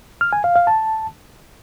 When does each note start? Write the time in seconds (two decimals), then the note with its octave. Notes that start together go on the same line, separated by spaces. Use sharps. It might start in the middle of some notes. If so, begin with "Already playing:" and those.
0.21 F6
0.33 G#5
0.44 F5
0.56 F5
0.67 A5